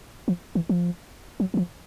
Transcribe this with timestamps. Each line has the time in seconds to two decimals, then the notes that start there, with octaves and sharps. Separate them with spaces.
0.28 F3
0.55 E3
0.69 F3
1.40 F#3
1.54 E3
1.57 F3